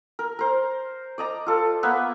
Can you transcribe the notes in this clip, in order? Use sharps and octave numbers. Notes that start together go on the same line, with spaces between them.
A#4
A#4 C5
D5 D#5 A#5
F4 A4
A#3 B3 B4 E5